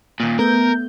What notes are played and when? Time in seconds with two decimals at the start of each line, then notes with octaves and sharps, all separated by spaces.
0.20 D#2 A#2
0.39 A3 B3 A#4 G6